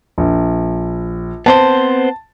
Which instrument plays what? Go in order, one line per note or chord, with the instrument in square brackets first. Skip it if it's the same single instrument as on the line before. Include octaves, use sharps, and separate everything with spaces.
[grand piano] A#1
[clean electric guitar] B3 C4 C5 [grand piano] A5